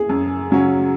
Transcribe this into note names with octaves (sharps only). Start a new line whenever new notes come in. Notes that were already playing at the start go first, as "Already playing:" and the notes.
Already playing: G#4
F#2
C#3 F#3 C#4